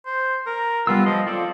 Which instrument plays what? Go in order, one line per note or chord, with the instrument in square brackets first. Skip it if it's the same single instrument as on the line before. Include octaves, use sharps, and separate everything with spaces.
[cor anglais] C5
A#4
[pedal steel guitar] G3 B3 E6 [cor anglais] F4
[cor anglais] F3 [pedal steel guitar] D#5
[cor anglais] C4 [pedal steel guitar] F4 A4 D5